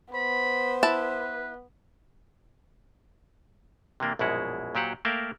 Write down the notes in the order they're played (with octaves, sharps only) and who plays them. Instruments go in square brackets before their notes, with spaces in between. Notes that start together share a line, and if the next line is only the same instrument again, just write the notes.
[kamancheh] B3 [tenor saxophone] C5 [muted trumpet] B5
[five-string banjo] E4 A5 [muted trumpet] B4
[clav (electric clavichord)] C3 E3 A#3 D4
A#1 F#2 B2 G#3 E4 F#5
A#2 F#3 G4 C5 F#5
A3 A#3 A#4 E5 F5 G5